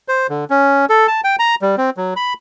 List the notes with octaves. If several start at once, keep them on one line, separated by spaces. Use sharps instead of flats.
C5
D3
C#4
A4
A5
G5
A#5
G3
C4
F#3
B5